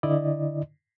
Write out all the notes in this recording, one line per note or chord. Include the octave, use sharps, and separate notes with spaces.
D3 E4 D5 D#5